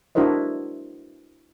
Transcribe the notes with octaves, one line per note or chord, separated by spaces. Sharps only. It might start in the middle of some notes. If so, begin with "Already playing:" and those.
D4 E4 F#4 A#4 C5 D#5